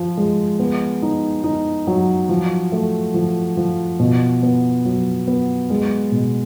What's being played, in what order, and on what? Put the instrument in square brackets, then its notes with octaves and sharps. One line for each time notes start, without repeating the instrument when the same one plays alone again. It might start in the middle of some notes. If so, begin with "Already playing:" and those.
Already playing: [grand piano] F3
G#3
B3
D#4
D#4
F#3
F3
A3
F3
F3
B2
B3
F#3
B3
G#3
B2